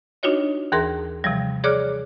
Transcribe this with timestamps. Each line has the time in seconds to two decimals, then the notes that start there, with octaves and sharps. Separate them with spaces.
0.23 D4 D#4 F4 F#4 C#5 D#5
0.72 D#2 E3 G#4 A#4 C6 A#6
1.24 C3 E3 F3 G3
1.64 G#4 C#5 D5 D6 F6 F#6